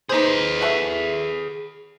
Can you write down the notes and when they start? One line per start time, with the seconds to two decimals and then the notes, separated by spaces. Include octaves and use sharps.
0.09 D#4 G4 G#4 B4 C5
0.61 F#4 A4 E5